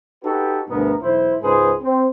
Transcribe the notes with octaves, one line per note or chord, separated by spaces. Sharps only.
D#4 F#4 G4 A4 B4
D2 G2 B2 B3 A#4
B1 E2 E4 C5
C#2 G#2 G#4 B4 C5
C4